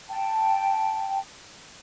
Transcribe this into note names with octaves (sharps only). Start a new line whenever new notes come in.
G5 A5